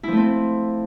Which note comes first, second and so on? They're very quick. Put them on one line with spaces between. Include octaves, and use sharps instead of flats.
E4 F3 A3 C4